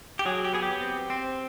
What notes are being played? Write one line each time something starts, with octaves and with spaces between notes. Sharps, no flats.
G4
F#3 G#4
G4
B3 G#4
G4
C4
C4